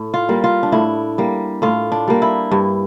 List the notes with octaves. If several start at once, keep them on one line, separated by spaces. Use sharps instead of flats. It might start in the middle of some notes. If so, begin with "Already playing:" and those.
Already playing: A2
F4
G3 A#3
F4
D4
A2 E4
G3 A#3
A2 F4
D4
G3 A#3
E4
G2